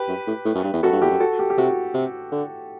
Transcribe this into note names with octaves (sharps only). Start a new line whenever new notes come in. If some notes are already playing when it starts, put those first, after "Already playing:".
Already playing: G4 B4
F#2
A2
A2
F#2
G2
E2
F#2 F#4 A4
G2
E2 G4
F#2
F#4 A4
G4
G4
C3 F#4
C3
D3